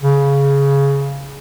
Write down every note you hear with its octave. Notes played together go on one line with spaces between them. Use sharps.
C#3